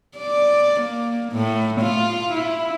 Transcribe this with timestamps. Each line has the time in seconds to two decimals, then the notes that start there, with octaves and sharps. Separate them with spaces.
0.17 D5
0.80 A#3
1.32 A2
1.80 F4
2.32 E4